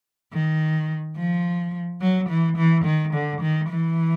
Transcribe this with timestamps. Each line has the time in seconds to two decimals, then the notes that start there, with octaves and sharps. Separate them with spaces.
0.33 D#3
1.17 F3
2.01 F#3
2.29 E3
2.57 E3
2.85 D#3
3.14 D3
3.42 D#3
3.70 E3